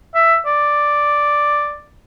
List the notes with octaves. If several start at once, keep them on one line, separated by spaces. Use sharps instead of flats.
E5
D5